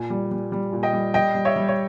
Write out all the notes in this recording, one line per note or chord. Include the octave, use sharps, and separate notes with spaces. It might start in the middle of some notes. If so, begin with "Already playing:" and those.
Already playing: A#2 G#5
G3
G3
G3
A#2
D#5 G5
G3
G3 D#5 G5
G3
C#5 E5
G3
C#5